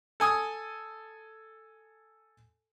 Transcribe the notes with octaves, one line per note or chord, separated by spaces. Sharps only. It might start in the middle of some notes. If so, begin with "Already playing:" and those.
A4 G#5 D#6